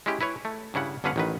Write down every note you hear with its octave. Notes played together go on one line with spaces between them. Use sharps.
G#3 C#4 E4 G4
E4 B4 C#5
A3
G2 C#3 E4 F#5
G1 D3 C#4 B4 F5 F#5
A1 D#3 B4